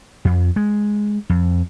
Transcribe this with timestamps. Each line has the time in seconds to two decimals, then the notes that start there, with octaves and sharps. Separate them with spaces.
0.25 F2
0.56 G#3
1.30 F2